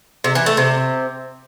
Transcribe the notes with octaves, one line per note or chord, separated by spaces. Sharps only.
C3
E3
A3
C3